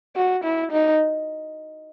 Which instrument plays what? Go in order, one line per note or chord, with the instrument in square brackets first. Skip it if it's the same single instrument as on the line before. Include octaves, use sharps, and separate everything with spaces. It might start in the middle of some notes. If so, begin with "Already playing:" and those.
[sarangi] F#4
E4
D#4